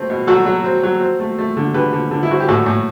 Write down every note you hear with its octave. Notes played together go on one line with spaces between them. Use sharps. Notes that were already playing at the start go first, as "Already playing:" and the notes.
Already playing: A3 C4
B2
F#3 F#4 A4
F#3
C4
F#3
C4
A3
A3
D3
D3 G4 B4
D3
D3
E4
C4 F#4
G4
A2 F#4 A4
A2